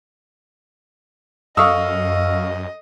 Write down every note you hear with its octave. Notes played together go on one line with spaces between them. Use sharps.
F#2 A4 D#5 F5 C#6 D#6 E6